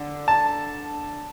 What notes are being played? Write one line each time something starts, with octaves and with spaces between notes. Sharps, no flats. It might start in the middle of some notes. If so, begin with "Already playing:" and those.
Already playing: D3
A5